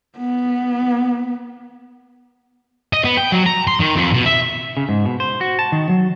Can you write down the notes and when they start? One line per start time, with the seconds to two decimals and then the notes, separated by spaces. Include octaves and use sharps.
0.18 B3
2.93 D#5
3.05 B3
3.17 G5
3.32 F#3
3.46 A#5
3.67 C6
3.80 D#3
3.96 F2
4.14 B2
4.26 E5
4.77 C#3
4.89 G#2
5.05 B2
5.20 C5
5.41 F#4
5.59 A5
5.72 D#3
5.89 F#3